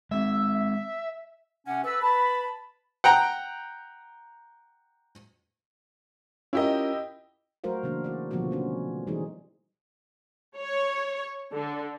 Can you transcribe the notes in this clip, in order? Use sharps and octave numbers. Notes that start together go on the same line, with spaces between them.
G#3 C4 E5
C3 C#4 F#5
A4 B4 E6
B4 A5 B5
F#5 G5 A#5
C#4 E4 F4 G4 A#4 D#5
F#3 A3 F#4 A#4 C5 F5
C#3 E3 A#3 D4
F#4 D5
B2 D3 F3 G3 B3 F#4
A3 C#4 F#4
E3 G3 D#4 G#4
C#5
D3